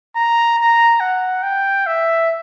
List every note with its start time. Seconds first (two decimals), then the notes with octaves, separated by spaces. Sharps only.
0.16 A#5
0.58 A#5
1.00 F#5
1.43 G5
1.87 E5